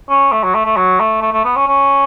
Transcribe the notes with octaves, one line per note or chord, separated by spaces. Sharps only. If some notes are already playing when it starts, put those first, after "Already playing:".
C#4
A3
F#3
A3
A3
F#3
A3
A3
A3
B3
C#4
C#4